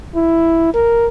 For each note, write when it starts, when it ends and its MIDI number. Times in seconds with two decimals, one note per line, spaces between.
0.15 0.70 64
0.74 1.08 70